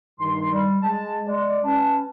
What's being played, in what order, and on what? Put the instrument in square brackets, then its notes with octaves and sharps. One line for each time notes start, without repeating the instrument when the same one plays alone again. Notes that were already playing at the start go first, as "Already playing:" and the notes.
[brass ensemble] G2 D#3 [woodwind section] C6
[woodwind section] G3
[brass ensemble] G#3 [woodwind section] A5
[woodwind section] G#3 [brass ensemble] D5
[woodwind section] C#4 [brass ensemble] B4 A5